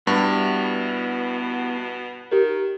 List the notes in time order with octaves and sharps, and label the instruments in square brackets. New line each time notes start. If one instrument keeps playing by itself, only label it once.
[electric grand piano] G2 [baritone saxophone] B2 [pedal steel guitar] B3 E4 G4
[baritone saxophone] D#3 [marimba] G4 A#4